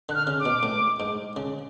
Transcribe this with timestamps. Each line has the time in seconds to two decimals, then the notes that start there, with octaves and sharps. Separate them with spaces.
0.09 D3 F#6
0.15 F6
0.27 C#3
0.40 D6
0.45 B2
0.63 A2
1.00 G#2
1.36 C#3